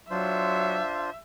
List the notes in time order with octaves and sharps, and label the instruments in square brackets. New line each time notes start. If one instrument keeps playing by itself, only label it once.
[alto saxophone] F#3 [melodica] D4 F4 C5 [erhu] E5